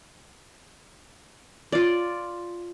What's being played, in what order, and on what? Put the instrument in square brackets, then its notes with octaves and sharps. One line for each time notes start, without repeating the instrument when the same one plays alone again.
[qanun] F4 D5